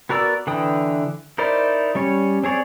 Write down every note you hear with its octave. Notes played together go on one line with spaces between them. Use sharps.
B3 F#4 A#4 D5 E6
D3 E3 B4 G5 D#6
D#4 E4 A#4 C5 D5
G3 C#4 C#5
C4 G#4 C#5 D5